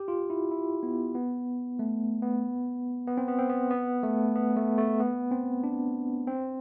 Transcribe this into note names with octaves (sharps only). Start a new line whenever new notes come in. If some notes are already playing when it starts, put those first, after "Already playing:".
Already playing: G4
F4
E4
E4
B3
B3
A3
B3
B3
C4
B3
C4
B3
B3
A3
B3
A3
A3
B3
C4
D4
C4